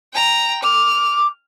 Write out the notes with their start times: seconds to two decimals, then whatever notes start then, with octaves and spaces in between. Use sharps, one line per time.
0.13 G5 A#5
0.63 D6 F6